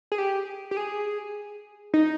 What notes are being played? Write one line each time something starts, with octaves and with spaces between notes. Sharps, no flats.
G#4
G4
G4
G#4
D#4